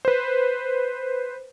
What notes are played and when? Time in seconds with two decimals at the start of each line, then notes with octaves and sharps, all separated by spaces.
0.05 B4 C5